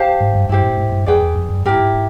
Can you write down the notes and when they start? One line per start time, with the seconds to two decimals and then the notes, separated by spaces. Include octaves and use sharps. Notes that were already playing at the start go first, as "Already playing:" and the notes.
Already playing: G4 C5 F5 A5
0.21 G#2
0.35 G2
0.49 G2 E4 G4 C5
0.64 A2
0.78 G#2
0.92 G2
1.06 F2 G#4 B4 D5 G5
1.22 E2
1.36 F2
1.50 F#2
1.65 G#2 E4 G4 A#4
1.80 G#2